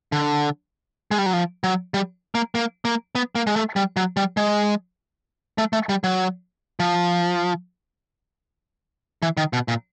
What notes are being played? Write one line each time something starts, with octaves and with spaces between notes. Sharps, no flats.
D3
G#3
G3
F#3
F3
F#3
G3
A#3
A#3
A#3
B3
A#3
G#3
A3
G3
F#3
G3
G#3
A3
A3
G3
F#3
F3
E3
D#3
B2
A#2